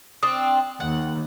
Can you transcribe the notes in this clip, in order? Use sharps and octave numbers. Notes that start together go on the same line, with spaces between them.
C4 D4 D#6
D#2 F#5